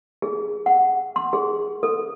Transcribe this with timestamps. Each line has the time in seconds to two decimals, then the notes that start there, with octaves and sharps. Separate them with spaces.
0.22 G#4
0.66 F#5
1.16 C6
1.33 G#4
1.83 A4